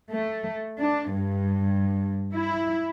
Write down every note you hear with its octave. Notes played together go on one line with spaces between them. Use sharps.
A3
D4
G2
E4